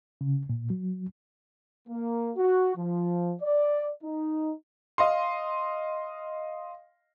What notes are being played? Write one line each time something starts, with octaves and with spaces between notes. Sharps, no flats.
C#3
A#2
F#3
A#3
F#4
F3
D5
D#4
D#5 F5 C6